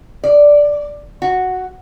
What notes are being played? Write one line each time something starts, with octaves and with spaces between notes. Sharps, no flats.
D5
F#4